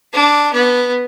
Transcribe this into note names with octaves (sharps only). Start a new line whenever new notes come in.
D4
B3